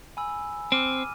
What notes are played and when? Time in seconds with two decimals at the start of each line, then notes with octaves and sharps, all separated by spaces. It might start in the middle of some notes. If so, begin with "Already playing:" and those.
0.17 G#5 B5 E6
0.72 C4 D6 F6 D#7